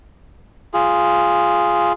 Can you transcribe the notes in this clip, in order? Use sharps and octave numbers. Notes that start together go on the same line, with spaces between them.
F4 G#4